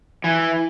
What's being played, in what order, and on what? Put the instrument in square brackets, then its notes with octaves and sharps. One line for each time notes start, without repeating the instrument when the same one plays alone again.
[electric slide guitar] E3